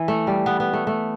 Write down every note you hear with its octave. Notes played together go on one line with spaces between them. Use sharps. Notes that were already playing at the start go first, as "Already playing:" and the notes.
Already playing: E3
A3
G3
B3
B3
A3
A3